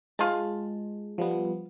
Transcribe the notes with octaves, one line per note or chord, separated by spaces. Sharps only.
G#3 F4 A5
F3 G3 B3